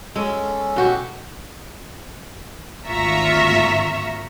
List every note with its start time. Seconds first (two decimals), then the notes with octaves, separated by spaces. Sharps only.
0.16 G#3 C#4 A4
0.76 B2 F#4 G4
2.87 G#1 D2 F4 E5 A#5 C#6